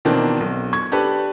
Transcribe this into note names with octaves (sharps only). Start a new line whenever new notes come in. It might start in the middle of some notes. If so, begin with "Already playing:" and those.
B2 D#3 E3 A#3 C4 D4
B1
C#6 G#6
D4 G4 A4 B4